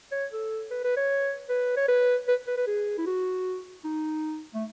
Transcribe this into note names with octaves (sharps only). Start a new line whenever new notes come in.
C#5
A4
B4
B4
C#5
B4
C#5
B4
B4
B4
B4
G#4
E4
F#4
D#4
A3